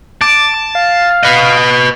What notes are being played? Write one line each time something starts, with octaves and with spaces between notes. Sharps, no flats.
A5 D6
F5
B4 D#5